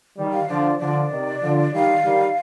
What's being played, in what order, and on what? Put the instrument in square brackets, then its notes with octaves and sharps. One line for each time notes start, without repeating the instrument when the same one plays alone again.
[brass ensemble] D#3 G3
[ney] F5
[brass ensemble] D3 F3 [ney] D5
[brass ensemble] D3 F3 [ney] D5
[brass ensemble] C3 D#3
D3 F3
[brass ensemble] D#3 G3 [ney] F5
[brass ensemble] D#3 G3